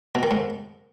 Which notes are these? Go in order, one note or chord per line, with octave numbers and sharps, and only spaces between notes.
B2
D#3
G#2